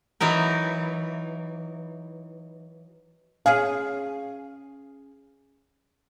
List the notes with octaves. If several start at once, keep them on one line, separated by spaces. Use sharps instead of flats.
E3 F#3 D#4 A#4
C#4 G#4 F5